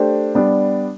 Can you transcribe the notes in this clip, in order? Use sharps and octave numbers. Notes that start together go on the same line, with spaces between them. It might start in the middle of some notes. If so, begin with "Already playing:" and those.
Already playing: A3 D4 G4 C5
G3 B3 D4